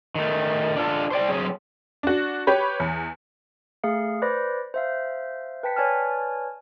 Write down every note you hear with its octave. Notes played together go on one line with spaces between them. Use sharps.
D#3 A3
D4 F4 A4
C5 D5 G5
F#3 C4 C#4 G#4
D4 F#4
G4 B4 C#5 B5
E2
A3 G#4 F5 C#7
B4 C5 D5 B5 D6 A#6
C5 E5 F5
B4 G5 A5 B6 C#7
B4 C#5 D5 G#5 A5 F6